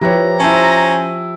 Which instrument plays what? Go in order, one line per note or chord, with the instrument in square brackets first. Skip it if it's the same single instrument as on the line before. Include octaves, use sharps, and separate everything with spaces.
[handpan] F3 G4 [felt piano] E4 B4 C#5 [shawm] A#5
[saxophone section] C#4 C5 [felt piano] E4 A5